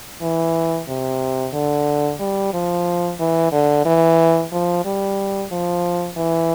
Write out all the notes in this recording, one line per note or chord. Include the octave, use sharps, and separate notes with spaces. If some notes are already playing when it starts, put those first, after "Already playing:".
E3
C3
D3
G3
F3
E3
D3
E3
F3
G3
F3
E3